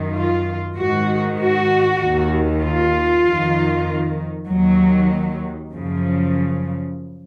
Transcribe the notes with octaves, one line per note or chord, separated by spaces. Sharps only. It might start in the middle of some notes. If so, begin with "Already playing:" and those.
Already playing: F#2 D#3
F4
G#2 D#3 F#4
F#4
D#2 D#3
F4
F2 D#3
D#2 D#3 F#3
F#2 C#3 F3